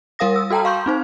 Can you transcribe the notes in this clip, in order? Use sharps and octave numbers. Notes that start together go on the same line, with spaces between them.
G3 A#4 F5 D#6 A#6
E6
F#4 A4 G5 A5 A#5
F5 C6 C#6 G6
C4 D#4 C5